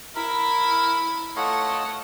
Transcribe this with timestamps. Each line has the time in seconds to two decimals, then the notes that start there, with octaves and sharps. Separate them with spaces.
0.15 E4 A#4 B5
1.36 A3 F4 C#5 D#5 F#5